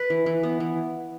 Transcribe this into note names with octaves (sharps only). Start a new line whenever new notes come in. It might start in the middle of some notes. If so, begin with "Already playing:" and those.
Already playing: B4
E3
E3
B3
E3